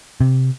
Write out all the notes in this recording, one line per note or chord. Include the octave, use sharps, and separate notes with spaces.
C3